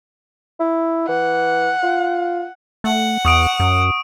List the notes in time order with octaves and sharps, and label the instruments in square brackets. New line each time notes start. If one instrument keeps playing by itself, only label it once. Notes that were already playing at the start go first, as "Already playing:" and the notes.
[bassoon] E4
[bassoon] E3 [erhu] F#5
[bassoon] F4
[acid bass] A3 [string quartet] F#5
[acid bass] E2 [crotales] C#6 D#6 D7
[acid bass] F#2